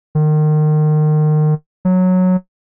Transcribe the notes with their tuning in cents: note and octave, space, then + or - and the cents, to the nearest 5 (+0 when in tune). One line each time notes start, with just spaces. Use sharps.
D#3 -30
F#3 -10